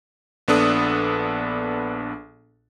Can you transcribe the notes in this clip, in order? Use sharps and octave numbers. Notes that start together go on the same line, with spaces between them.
A#1 B3 D4 A4 D#6